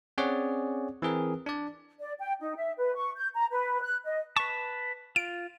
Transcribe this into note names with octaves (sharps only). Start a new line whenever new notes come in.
C4 C#4 G#4 C#5 D5 F#5
E3 C4 G#4 A#4
D4 D5
D5
G5
D#4
E5
B4
C#6
G6
A#5
B4
F#6
D#5
B4 A5 C#6
F4 D7